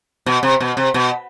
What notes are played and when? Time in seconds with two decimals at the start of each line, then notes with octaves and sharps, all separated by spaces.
0.26 B2
0.43 C3
0.60 B2
0.77 C3
0.94 B2